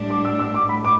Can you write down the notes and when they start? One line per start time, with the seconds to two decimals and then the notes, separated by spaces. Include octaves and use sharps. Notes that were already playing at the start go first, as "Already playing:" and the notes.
Already playing: A2 G3 D4
0.10 D6
0.25 E6
0.39 E6
0.54 D6
0.69 A2 B5
0.85 D6